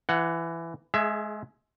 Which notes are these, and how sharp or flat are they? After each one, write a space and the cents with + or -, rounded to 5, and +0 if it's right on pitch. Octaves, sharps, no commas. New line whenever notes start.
E3 +15 F#5 +0
G#3 +30 G#4 +0 E5 +20